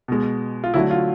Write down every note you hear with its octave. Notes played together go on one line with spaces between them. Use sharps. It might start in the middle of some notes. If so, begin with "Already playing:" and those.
B2 G#3
F4
D3 F#3 A3 E4
F4